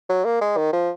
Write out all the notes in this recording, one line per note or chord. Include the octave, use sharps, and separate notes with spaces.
F#3
A#3
G#3
D#3
F3